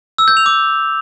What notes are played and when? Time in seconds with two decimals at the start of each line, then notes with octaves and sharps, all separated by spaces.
0.18 E6
0.28 G6
0.37 F7
0.46 D6